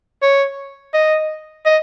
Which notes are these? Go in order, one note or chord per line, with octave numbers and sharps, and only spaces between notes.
C#5
D#5
D#5